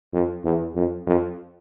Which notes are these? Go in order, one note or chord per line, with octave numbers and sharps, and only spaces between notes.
F2
E2
F2
F2